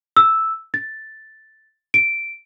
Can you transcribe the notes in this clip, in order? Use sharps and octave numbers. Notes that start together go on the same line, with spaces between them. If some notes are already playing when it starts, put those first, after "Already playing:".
E6
A6
D7